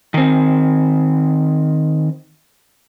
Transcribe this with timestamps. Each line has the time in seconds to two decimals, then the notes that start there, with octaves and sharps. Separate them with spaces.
0.14 D#3 C4